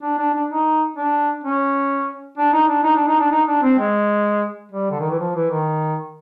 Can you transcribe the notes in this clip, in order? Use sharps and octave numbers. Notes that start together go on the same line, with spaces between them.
D4
D4
D4
D#4
D4
C#4
D4
D#4
D4
D#4
D4
D#4
D4
D#4
D4
C4
G#3
G3
D3
D#3
E3
F3
E3
D#3